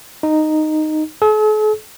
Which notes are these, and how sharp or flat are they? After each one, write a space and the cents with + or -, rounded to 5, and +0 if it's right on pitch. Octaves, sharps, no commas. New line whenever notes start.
D#4 -10
A4 -45